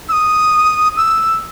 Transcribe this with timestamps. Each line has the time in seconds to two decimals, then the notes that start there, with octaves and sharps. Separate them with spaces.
0.09 E6
0.12 D#6
0.97 E6